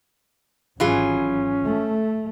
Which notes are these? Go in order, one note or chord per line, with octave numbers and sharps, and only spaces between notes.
G#1 E3 F#3 C#4 F4 G#4
A3